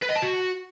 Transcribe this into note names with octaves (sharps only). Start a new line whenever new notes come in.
B4
D#5
A5
F#4